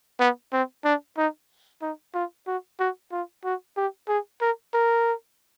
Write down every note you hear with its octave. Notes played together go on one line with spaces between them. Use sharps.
B3
C4
D4
D#4
D#4
F4
F#4
F#4
F4
F#4
G4
G#4
A#4
A#4